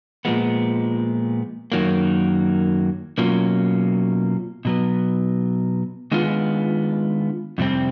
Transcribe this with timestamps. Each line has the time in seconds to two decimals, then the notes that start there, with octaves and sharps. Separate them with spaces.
0.25 A#2 F3 G#3 B3
1.72 F#2 D#3 F#3 A#3
3.18 B2 F#3 A#3 C#4 F4
4.65 B2 F#3 B3
6.12 D#3 G#3 B3 D4 F4
7.58 F2 C3 G3 C4